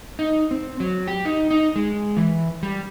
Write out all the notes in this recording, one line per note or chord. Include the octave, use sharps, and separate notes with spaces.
D#4
C4
F#3
G4
D#4
D#4
G#3
E3
G3